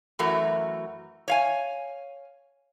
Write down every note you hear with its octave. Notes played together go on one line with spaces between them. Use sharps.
F#2 E3 A3 F#4 A#4
C#5 F5 G#5